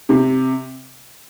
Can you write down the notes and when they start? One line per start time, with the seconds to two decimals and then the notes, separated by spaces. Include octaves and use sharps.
0.09 C3